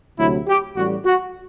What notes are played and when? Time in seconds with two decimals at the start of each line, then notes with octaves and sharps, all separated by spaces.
0.18 D2 C3 F#3 E4
0.48 G4
0.76 A1 A2 G3 F#4
1.05 F#4